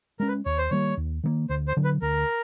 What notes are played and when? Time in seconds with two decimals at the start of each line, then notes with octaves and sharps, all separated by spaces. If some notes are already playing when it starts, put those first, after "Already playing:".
0.20 G#3 C#4 A#4
0.28 B4
0.45 D#2 C#5
0.58 C5
0.70 D#3 G3 A#3 C#5
0.97 D#2
1.23 D#3 G3 A#3
1.49 D2 C5
1.68 C5
1.77 D3 F#3
1.84 B4
2.02 D2 A#4